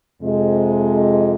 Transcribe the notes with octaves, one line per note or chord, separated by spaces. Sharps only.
F2 C3 G#3